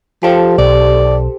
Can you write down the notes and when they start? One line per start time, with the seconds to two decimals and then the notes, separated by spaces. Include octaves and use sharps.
0.23 F3 G4 A4 C5
0.58 B1 D5